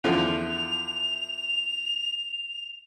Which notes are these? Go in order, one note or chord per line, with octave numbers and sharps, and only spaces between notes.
E2 D3 F3 F7